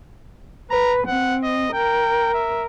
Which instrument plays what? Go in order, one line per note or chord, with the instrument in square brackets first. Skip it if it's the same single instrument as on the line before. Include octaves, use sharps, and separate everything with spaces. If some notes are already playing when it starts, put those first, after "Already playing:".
[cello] B4 [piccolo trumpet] A#5
[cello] C4 [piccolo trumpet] F#5
[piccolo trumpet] D#5
[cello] A#4 [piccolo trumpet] G5
[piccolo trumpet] E5